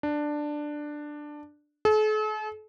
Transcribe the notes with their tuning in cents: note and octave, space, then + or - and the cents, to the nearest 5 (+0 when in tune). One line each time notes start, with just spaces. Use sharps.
D4 +10
A4 -45